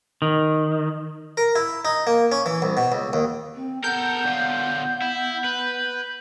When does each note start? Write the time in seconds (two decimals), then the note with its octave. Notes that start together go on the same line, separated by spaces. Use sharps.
0.22 D#3
1.37 A#4
1.55 E4
1.85 D#4
2.07 A#3
2.32 C#4
2.46 E3
2.62 C2
2.77 B2
2.92 C#2
3.13 D#2
3.55 C4
3.84 B3 A4 A#4 G6
4.25 D3 F4
5.02 E4
5.44 B4